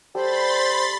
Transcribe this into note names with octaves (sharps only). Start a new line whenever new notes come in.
G3 G4 A4 C5 B5 C6 A6